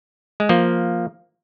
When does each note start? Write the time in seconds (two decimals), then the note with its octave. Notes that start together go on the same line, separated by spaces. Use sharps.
0.40 G#3
0.49 F3 A#3